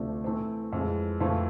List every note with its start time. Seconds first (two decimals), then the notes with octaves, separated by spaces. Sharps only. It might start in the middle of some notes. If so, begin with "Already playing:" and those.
Already playing: D2 C3 F3 A3 D4
0.24 E3 A3 C4
0.73 F2 E3 G#3
1.20 F2 E3 A3 C4 F4